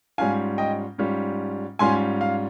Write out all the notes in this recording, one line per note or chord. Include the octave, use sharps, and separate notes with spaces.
G#2 G3 C#4 F4 F5 G#5
D#5 G5
G#2 G3 C#4 F4
G#2 G3 C#4 F4 G#5 C6
F5